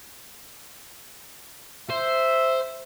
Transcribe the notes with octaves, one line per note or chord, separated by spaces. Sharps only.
C5 E5